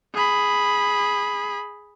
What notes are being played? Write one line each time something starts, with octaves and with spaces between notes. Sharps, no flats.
G#4 B5